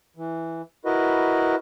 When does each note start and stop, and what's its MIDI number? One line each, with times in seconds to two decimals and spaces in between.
0.17 0.62 52
0.85 1.56 64
0.85 1.56 66
0.85 1.56 70
0.85 1.56 71
0.85 1.56 75